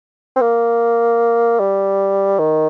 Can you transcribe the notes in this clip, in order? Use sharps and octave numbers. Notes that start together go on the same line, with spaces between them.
C4
A#3
G3
D#3